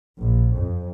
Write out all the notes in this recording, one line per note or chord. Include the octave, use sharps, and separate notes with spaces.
A#1
F2